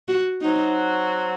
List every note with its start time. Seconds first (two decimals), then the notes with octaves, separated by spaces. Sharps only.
0.08 F#4
0.41 F#3 C4 D#4 F#4